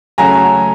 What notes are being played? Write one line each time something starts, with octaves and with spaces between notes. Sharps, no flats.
C#3 F#3 A3 G#5 A#5